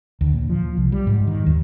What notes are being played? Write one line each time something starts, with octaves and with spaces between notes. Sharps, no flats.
D2
A#2
F3
C2
G3
G#2
D#3
D#2